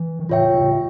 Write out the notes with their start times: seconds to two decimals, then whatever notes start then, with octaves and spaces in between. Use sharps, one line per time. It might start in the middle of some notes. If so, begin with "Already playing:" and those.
Already playing: E3
0.19 D3
0.29 A2 C#3 F4 C#5 E5 G5
0.54 A2 C#3